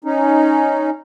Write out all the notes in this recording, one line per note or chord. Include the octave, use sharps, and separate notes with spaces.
C#4 D#4